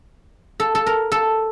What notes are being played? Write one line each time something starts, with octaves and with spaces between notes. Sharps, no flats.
A4
A4
A#4
A4